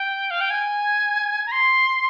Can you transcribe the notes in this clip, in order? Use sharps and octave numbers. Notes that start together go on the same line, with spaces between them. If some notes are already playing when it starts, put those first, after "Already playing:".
Already playing: G5
F5
G5
G#5
A#5
C6